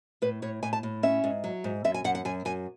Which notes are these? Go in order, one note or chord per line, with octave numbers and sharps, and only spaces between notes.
A2 B4
A2 C#5
A2 G#5
A5
A2
C#4 E5
G#2
F#3
G#2
F#2 E5
G#5
F#2 F#5
F#5
F#2 G#5
F#2 G#5